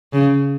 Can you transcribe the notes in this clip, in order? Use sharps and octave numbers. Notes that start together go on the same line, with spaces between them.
C#3